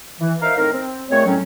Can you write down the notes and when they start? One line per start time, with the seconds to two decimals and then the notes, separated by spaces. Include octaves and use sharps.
0.20 E3
0.41 D#4 A#4 C5 E5 F5
0.56 A2 D#3 C4 D#4 A#4
0.72 C4
1.10 A#2 G#3 A3 C4 C#5
1.26 A2 F#3 C4 C#4